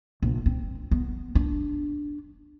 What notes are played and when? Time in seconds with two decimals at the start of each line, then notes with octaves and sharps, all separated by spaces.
0.23 A#1
0.46 C4
0.91 B3
1.35 D4